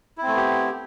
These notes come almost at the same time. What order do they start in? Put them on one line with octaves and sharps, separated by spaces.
E4 C4 A3 B3 G4